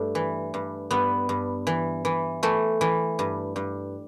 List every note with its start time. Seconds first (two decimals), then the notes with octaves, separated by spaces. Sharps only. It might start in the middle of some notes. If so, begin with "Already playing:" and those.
Already playing: G2 A3
0.15 E3
0.54 G2
0.91 G2 B3
1.29 G2
1.67 E3
2.05 E3
2.43 E3 A3
2.81 E3
3.19 G2
3.56 G2